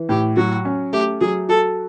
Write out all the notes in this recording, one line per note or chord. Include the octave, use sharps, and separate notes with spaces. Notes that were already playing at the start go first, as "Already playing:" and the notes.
Already playing: E3
A2 G4
F#3 F#4
C#4
A3 G4
F#3 G#4
F#4 A4